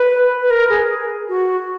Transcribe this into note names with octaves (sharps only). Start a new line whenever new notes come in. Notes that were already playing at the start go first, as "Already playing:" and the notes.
Already playing: B4
B4
A#4
G#4
F#4